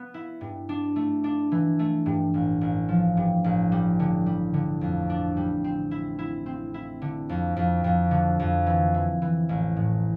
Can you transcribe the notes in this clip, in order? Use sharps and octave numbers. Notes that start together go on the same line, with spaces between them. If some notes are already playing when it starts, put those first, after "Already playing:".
Already playing: B3
E4
G2
D4
A3
D4
E3
A3
G2
A1
A1
F3
G2
A1
G3
D3
G3
D3
F2
D4
G3
C4
E4
E4
C4
E4
D3
F2
F2
F2
D3
F2
E3
E3
E3
A1
A2